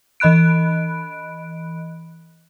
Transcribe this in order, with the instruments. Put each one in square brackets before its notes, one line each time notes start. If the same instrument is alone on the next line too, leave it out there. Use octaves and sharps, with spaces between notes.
[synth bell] E3 D#5 B5 F#6 D7